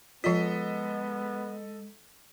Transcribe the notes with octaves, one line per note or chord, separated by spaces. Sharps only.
F3 G#3 B3 F4 A4 D#5 B6